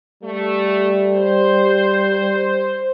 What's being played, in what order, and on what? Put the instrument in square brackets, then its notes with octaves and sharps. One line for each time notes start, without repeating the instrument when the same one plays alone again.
[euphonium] G3 [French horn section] A3
[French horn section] C5